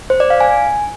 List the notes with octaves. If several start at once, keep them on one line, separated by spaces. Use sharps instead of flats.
C5
D5
F5
G#5